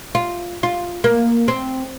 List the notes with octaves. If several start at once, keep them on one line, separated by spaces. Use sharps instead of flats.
F4
F4
A#3
C4